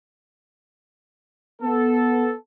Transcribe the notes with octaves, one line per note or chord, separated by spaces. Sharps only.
B3 A4